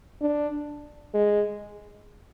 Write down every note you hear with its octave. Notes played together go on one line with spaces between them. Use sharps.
D4
G#3